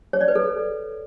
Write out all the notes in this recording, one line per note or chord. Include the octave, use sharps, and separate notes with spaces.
C#5
D5
B4
A4